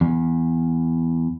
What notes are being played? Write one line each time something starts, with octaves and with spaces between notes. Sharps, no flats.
E2